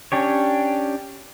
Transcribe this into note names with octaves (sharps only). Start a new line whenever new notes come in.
C#4 D4 G4 C#5